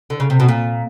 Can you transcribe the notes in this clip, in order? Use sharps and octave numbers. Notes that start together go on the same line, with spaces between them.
D3
C#3
C3
B2
A#2